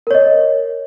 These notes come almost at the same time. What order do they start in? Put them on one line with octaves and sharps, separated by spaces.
A#4 C#5 D#5